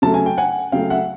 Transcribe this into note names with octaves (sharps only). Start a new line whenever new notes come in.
C#3 F#3 A3 A5
G#5
G5
F#5 G#5
C#3 F#3 A3 F5 G5
E5 F#5